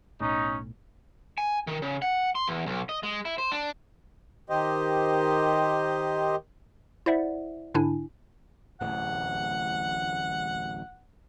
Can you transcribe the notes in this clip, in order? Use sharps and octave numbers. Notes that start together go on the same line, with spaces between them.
B1 A2 C#4 D#4
G#5
D#3
C#3
F#5
C6
E2
B1
D#5
G#3
E4
C5
D4
D#3 G4 C5 D#5
E4 C5 D5 E5 F#5
G#2 D3 D4 E4 G#5
D1 A1 E2 F#5